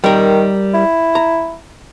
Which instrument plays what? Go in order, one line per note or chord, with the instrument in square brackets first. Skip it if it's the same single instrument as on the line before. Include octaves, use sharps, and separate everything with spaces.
[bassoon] D#3 [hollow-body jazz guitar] G3 A#4
[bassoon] E4
[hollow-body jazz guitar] A#5